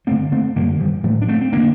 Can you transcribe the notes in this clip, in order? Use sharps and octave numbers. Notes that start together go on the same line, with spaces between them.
G2 D3 A3 C4
A3 C4
F#2 D3 G3 A#3
D#3 G3
A2 F#3 A3
D4
A3 C4
C4
D3 A#3 D4